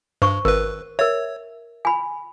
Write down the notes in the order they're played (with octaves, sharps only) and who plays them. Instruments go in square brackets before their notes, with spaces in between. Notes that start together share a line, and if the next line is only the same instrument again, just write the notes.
[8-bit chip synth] G2 [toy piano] C5 C#6
[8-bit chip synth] G#1 B4 [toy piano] A#4
[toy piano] A#4 E5 [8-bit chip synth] C#5
[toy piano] G#5 B5